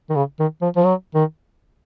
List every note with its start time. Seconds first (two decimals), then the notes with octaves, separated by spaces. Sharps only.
0.10 D#3
0.16 C#3
0.39 D#3
0.62 F3
0.76 F3
0.84 F#3
1.15 D#3